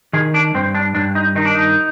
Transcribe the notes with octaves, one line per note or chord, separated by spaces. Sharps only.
D#3 G#4
D4
G2 C4
D4
G2 D4
D#4
D#3 D#4
D4
D#4